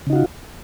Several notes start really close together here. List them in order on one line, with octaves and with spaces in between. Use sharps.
C#3 D#4 F#4 F4